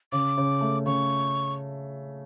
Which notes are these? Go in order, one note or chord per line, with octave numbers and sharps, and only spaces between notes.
C#3 D6
C#3
A3
C#3 C#6